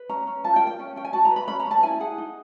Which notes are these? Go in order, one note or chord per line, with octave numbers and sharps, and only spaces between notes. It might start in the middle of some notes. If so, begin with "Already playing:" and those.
Already playing: B4
C#4 A#5
C#4
F4 A5
G5
A#4
G5
C#4
C#4 G5
G#5
F#4 A5
A#5
B4
B5
C#4 B5
A#5
C#4 A5
E4 G#5
G#4 F#5
D#4